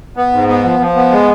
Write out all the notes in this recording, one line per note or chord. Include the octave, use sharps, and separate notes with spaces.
B3
G#2
B3
F3
F3
B3
G#3